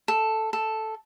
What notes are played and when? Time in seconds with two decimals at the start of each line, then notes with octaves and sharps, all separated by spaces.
0.08 A4
0.53 A4